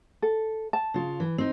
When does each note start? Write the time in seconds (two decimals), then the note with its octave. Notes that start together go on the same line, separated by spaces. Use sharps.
0.22 A4
0.73 A5
0.94 C#3 F4
1.20 E3
1.38 C4 D#4